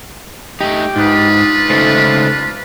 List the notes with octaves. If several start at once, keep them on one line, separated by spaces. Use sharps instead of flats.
A3 D#4 G4
G#2 D4 D#4 F4 B4 D#6
C#2 A3 A4 C5